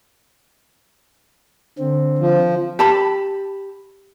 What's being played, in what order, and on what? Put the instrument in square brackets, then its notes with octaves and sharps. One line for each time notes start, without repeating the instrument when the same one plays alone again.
[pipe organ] D3 C4
[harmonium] F3
[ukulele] G4 A5 B5